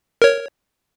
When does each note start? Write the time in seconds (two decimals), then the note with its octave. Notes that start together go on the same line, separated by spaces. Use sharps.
0.22 A#4 C#5